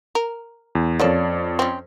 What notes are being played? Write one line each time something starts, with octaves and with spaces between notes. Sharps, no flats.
A#4
E2
F2 A#3 C#4 A4 C#5 D5
C4 C#4